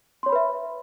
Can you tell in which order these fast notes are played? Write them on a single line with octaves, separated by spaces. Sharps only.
C6 C#5 B5 B4 E5